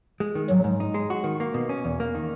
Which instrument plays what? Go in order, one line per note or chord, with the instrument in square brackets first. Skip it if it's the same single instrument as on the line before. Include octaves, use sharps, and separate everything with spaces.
[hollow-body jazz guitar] G#3
D#3
[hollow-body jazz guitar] G#2 [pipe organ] F#3
[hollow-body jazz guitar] G#2
D#4
G#3
F#4
D#3
A#3
B2
C#4
E2
A#3
D#3